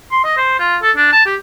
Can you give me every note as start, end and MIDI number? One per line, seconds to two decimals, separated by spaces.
0.11 0.20 84
0.24 0.36 75
0.37 0.55 72
0.59 0.77 65
0.82 0.91 69
0.97 1.08 62
1.13 1.23 81
1.26 1.35 67